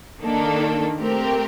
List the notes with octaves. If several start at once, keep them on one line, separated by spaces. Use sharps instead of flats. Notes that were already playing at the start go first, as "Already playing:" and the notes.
D#3 A#3 D4 A4
A3 C4 G4 A#4